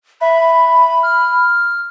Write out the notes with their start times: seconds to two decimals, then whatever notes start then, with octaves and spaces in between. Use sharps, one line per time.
0.21 E5 B5
1.03 F6